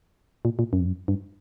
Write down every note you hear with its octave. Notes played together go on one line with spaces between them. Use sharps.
A#2
A#2
F#2
F2
F#2
G2